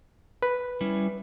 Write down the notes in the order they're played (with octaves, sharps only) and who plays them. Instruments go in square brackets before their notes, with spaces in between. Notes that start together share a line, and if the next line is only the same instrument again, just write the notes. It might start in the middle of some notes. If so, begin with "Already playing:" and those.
[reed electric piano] B4
[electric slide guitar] G3 C#4 E4